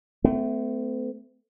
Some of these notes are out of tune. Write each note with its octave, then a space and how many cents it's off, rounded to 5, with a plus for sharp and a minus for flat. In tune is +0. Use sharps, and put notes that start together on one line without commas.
A3 +0 C4 -45